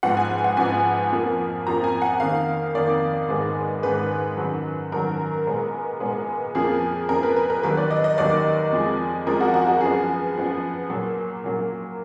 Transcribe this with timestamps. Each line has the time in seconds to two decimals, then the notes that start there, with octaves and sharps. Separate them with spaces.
0.03 G#2 F3 B3 F#5
0.17 G#5
0.30 G#5
0.44 F#5
0.57 G#2 F3 B3 G#5
1.12 F2 F3 A#3
1.67 F2 F3 A#3 A#5
1.84 G#5
2.02 F#5
2.20 F2 D#3 A#3 F5
2.74 F2 D#3 A#3 D5
3.29 G#2 D#3 G#3 B3
3.83 G#2 D#3 G#3 B3 B4
4.37 F#2 D#3 F#3
4.92 F#2 D#3 F#3 A#4
5.47 A#2 G#3 B3
6.00 A#2 G#3 B3
6.55 F2 F3 A#3 G#4
7.09 F2 F3 A#3 A#4
7.23 B4
7.36 B4
7.50 A#4
7.63 D#2 D#3 F#3 B4
7.77 D5
7.91 D#5
8.04 D#5
8.18 D#2 D#3 F#3 D5
8.72 F2 F3 G#3
9.26 F2 F3 G#3 A#4
9.41 F#4
9.54 F#4
9.67 F#4
9.81 F#2 F3 B3 G#4
10.35 F#2 F3 B3
10.90 A#2 F#3 A#3
11.44 A#2 F#3 A#3